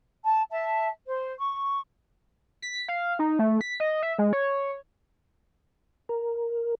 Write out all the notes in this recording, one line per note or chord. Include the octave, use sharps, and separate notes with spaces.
A5
E5 A5
C5
C#6
B6
F5
D#4
A3
B6
D#5
E5
G#3
C#5
A#4